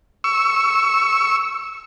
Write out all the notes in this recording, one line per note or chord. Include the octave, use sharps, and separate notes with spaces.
C#6 E6